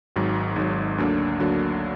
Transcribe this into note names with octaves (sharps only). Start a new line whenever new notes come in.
G#1 G#2 F#3
G#1 G#2 F#3
D2 D3 F#3 A#3 D4
D2 D3 F#3 A#3 D4